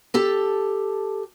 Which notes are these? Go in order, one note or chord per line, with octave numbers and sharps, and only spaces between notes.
G4 A4 A5